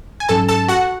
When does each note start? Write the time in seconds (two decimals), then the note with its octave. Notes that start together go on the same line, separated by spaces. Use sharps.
0.20 G#5
0.29 G#2 F#3 C#4 A4 A5
0.49 A4 A5
0.68 F#4 F#5